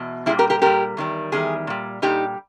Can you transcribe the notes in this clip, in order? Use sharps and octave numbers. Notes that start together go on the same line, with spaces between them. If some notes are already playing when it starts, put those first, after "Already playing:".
Already playing: E2 B2
A#2 G3 E4 G#4
G4 A#4
G4 A#4
A#2 G3 G4 A#4
E2 D#3 G3
E2 D#3 G3 G#4
A#2 G3
A#2 G3 D#4 G4